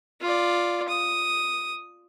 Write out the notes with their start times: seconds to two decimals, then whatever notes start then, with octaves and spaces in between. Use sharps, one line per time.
0.21 F4 D5
0.88 D#6